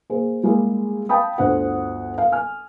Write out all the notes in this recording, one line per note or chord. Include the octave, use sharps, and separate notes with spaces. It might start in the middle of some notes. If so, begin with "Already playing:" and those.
A#3 G#4 C5
G3 G#3 A#3 E4 G#4
F5 G5 A5 B5 D#6
G1 D2 C5 F#5
F5
G#5 F6